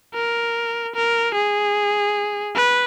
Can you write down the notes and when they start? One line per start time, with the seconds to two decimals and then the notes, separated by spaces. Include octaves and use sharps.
0.14 A#4
0.95 A#4
1.35 G#4
2.55 B4